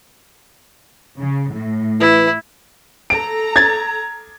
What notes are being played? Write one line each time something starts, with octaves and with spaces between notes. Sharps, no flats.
C#3
A2
E3 E4
A4 A#5 D7
G#6 A6